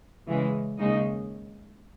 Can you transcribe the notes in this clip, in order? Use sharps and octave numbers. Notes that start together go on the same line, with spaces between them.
C#3 E3 G#3
D#2 C#3 G#3 D#4 D#5